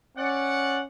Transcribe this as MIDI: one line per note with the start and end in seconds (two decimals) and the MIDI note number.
0.17 0.86 61
0.17 0.80 74
0.17 0.80 78